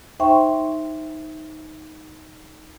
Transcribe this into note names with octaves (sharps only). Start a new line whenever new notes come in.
D#4 C5 E5 G5 C6 C#6